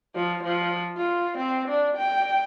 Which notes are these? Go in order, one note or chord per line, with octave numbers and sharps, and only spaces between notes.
F3
F3
F4
C4
D4
G5